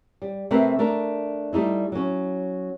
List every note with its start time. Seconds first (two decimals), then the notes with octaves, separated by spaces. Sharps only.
0.22 G3
0.51 C3 A3 C4 A#4 B4
0.79 A3 D4 A#4
1.53 G3 A3 D#4 E4
1.92 F#3 C#4